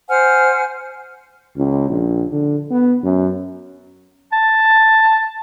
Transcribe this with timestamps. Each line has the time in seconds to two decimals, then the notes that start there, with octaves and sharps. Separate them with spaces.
0.09 C5 F#5 G#5 F6
1.57 C#2
1.90 A#1
2.32 D3
2.71 B3
3.03 F#2
4.33 A5